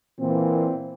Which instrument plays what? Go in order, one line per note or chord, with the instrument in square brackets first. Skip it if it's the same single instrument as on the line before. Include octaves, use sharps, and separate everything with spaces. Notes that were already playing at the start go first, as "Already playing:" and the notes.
[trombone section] A#2 E3 [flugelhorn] C4